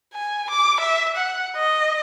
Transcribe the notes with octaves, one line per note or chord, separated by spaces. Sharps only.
G#5
D6
E5
F#5
D#5